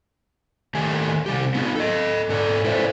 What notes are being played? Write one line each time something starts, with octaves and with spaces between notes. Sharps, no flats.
D#3 A3 G4 G#5
C3 G3 G4
B3 D#4 E4 G#4
A4 D#5
G#2 A4 D5
E4 A4 B4 C5 D5 E5